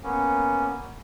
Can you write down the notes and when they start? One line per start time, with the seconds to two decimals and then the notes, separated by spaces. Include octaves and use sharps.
0.04 A#3 B3 C#4